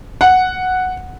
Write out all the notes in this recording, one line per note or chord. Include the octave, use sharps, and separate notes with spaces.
F#5